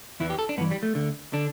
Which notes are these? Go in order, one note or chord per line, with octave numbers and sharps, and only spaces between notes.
E2 E3 E4
G4
A4
D4
G2 E3 B3
G3
A3
D2 D3
D3 D4